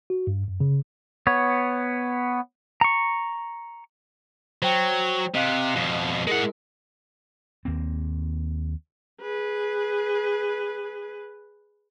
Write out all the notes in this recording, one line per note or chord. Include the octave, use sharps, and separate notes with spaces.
F#4
G2
F#2
C#3
B3 C#5
A#5 C#6
F#3 C5 G5
C3 D#5 F5 F#6
F2 B2
G#3 E4 G#4 A#4 F#5
D#2 A#3 C4
G#4 B4